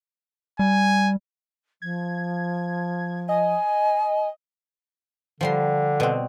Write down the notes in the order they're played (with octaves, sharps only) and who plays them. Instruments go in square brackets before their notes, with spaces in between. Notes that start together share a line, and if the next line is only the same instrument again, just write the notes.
[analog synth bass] G3 [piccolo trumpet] G#5
[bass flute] F3 [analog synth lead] G#6
[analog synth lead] D#5 [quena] G#5
[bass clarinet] D3 [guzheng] F3 G3 C6
[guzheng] B2 C4